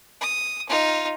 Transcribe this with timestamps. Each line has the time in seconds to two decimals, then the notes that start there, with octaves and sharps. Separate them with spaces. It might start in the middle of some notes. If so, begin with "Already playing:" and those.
0.21 D#6
0.69 D#4 F4